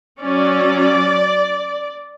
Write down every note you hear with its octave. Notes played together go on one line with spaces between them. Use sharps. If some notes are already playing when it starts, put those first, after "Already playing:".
F#3 C#4 D5